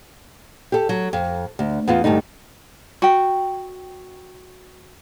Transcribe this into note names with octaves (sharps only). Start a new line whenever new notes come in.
G4 A4
F#3
F2
D2
E2 B3 F4
D2 G2 A3 D#4
F#4 G5